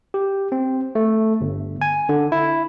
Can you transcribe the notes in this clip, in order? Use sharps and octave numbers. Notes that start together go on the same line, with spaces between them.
G4
C4
A3
G1
G#5
D3
E4